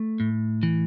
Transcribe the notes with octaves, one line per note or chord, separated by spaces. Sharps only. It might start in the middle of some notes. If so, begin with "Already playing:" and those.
Already playing: A3
A2
E3